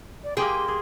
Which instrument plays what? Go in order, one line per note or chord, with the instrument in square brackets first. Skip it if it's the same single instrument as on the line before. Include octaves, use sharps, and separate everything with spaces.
[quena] D5
[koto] A#3 G4 G5 [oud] G#4 [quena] C6
[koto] G#4